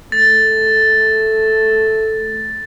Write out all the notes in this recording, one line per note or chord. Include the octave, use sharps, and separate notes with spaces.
A3 A6